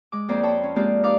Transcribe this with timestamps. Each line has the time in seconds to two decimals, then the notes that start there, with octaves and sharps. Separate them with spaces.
0.12 G#3 D6
0.28 F2 A#3 C4 G#4 C5 D5
0.43 C5 C#5 G5 A5 B5
0.64 C#4
0.76 G#3 A#3 C4 F4 G4 D5
1.03 D#4 B4 D5 F5 D6